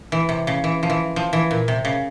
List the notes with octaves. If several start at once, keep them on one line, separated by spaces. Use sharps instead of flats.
E3
C3
C#3
E3
F3
E3
F3
E3
A#2
C3
C#3